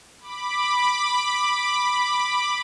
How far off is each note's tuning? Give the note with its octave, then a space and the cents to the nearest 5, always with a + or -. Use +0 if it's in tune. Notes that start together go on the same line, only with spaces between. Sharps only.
B5 +0 D6 +10